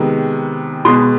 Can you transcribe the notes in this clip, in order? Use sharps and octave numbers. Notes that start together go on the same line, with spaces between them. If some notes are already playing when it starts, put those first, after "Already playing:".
Already playing: C3 D#3 G#3 B3
B2 G#3 B3 C6